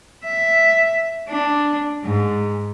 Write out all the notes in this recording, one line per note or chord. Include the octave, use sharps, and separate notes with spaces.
E5
D4
G#2